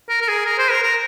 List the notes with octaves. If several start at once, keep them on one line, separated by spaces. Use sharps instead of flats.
A#4
A#4
G#4
A#4
C5
A#4
A#4